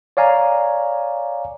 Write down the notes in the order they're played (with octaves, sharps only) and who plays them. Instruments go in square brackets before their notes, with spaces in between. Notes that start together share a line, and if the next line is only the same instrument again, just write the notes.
[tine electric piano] C#5 D5 F5 G#5 A#5